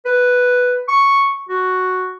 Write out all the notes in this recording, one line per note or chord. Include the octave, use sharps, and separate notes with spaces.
B4
C#6
F#4